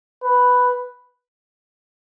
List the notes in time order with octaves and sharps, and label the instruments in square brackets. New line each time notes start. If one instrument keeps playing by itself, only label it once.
[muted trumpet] B4